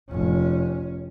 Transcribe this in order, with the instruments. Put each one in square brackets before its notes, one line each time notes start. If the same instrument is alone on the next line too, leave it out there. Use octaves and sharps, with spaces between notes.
[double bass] F1 C#4